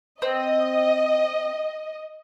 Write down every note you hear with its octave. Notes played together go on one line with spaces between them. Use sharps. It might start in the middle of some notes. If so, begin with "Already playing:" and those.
C4 D#5